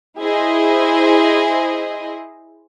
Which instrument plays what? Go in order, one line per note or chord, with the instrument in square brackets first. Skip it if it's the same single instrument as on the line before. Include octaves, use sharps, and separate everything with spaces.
[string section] E4 G#4 C5 D#5